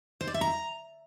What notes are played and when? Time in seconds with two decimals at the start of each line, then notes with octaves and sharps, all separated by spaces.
0.21 C5
0.27 D5
0.34 E5
0.41 A#5